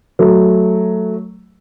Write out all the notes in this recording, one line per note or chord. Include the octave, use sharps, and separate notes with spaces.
F#3 A3